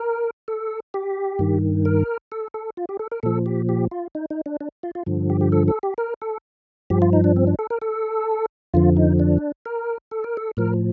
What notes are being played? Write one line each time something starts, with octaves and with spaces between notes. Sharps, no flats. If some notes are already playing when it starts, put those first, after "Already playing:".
Already playing: A#4
A4
G4
G2 D#3
A#4
A4
A4
F4
G4
A4
A#4
A#2 F3 A4
G4
G4
F4
D#4
D#4
D4
D4
F4
F4
G2 D3 F3
G4
G4
A4
A4
G4
A#4
A4
G2 F3 G4
F4
D#4
D4
C4
D4
A4
A#4
A4
F2 D3 F3 F4
D#4
D4
A#4
A4
A#4
A4
A2 F3 A#4